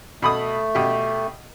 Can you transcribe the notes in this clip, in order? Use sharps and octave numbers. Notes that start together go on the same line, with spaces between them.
B2 A3 B5 D#6
B2 G4